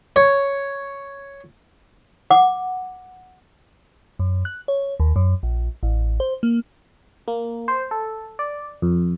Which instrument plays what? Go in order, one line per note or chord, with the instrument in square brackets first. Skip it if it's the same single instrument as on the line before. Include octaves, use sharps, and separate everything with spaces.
[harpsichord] C#5
[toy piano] F#5 D6
[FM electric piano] F#2
F#6
C#5
D#2
F#2
A#1
A1
C5
A#3
A#3
C5
A4
D5
F2